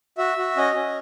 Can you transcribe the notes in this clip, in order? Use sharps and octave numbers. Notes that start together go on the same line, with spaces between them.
F#4 E5
F#4
C#4 D#5
C#4